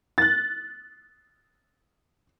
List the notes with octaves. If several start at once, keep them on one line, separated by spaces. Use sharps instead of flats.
F#6 A6